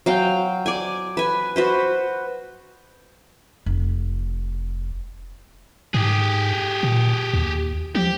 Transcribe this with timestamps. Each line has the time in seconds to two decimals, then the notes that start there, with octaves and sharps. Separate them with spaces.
0.06 F#3 F5 G5
0.66 D5 G#5
1.17 B4 G#5
1.56 F#4 B4 C5
3.66 F1
5.94 G#2 G4 G#4
6.83 A#2
7.33 D#2
7.95 F3 G4